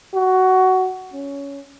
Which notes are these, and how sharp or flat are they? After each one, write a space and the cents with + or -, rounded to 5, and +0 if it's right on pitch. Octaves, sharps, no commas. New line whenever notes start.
F#4 +15
C#4 +15